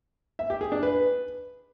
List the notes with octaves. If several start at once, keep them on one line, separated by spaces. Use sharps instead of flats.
E5
G4
G#4
D4
B4